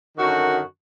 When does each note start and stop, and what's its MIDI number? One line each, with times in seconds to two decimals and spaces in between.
0.18 0.60 42
0.18 0.60 50
0.18 0.60 51
0.18 0.60 66